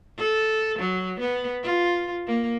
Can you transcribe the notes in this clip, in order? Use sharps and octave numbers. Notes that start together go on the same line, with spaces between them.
A4
F#3
B3
F4
A#3